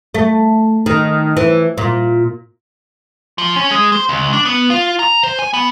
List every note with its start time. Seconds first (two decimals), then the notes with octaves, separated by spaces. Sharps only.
0.14 A3
0.86 D#3
1.37 E3
1.78 A#2
3.38 F3
3.56 C#4
3.71 G#3
3.92 C5
4.09 C#2
4.33 D4
4.45 B3
4.70 F4
4.99 A#5
5.23 C5
5.39 G#5
5.53 B3